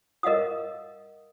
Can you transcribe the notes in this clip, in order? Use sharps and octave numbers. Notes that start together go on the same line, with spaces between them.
A#4 D#5 F5 F#5 D#6